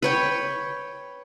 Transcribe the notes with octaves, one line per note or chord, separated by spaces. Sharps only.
B4 C#5 G5